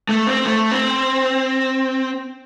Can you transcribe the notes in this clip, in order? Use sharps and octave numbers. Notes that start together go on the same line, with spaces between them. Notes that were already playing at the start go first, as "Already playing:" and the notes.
A3
C4
A3
C4